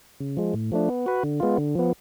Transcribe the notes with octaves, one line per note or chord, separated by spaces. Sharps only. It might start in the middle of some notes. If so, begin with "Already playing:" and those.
C#3
F3 G#3
A2
F3 A3 D4
B3
F#4 B4
D3
G#3 B3 F4
D3
F3 B3